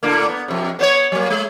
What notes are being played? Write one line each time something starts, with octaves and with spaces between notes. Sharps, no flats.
A2 D3 A#3
B3
F2 C3
B3 C5 C#5
F#3 A#3
G#3